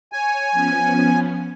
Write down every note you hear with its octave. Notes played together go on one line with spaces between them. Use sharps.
C#5 G#5
F3 B3 C#4